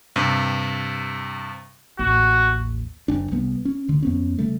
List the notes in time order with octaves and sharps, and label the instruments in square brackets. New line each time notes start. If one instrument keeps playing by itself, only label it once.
[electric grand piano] G2 C3
[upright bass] A1 D#2 [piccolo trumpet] F#4
[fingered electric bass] F#1 D4
C2 G3 B3
C#4
D2 D3
F2 B3 C#4
C#3 G3 A3